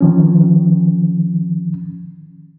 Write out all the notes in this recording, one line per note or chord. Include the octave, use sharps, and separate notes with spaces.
D#3 F3 C#4